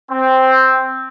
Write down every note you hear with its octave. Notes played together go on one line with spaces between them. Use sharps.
C4